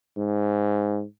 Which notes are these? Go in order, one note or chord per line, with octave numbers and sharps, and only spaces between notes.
G#2